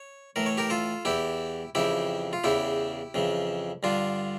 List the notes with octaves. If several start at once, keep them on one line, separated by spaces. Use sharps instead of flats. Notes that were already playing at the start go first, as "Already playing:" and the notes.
Already playing: C#5
A2 E3 A#4
C#5
G4 A#4
F4 A4
E2 E3 E4 G4
F2 C#3 E3 E4 G4
F4
E2 C#3 E3 E4 G4
F2 C#3 E3
G2 D3 D4 F4